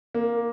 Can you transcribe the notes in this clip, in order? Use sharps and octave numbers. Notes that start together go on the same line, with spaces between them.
A#3